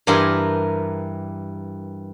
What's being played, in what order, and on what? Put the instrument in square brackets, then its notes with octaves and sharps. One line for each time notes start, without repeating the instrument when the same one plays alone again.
[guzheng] G2 E3 G4 A#4 G#5 C6